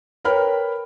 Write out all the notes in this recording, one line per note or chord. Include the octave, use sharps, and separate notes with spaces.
A#4 B4 C#5 G5 B5 F6